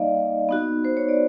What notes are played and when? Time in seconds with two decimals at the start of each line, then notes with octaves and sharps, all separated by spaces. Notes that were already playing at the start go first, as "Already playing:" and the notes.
Already playing: G3 A#3 D#4 D5 D#5 F5
0.49 B3 D#4 F#4
0.85 C5
0.97 C#5
1.08 D5